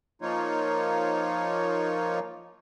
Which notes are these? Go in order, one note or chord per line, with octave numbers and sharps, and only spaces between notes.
F3 A#3 D#4 F4 C#5